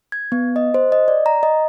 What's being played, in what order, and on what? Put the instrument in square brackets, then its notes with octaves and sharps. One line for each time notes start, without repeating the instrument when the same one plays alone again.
[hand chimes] G#6
B3
D#5
C5
D#5
D5
A#5
D#5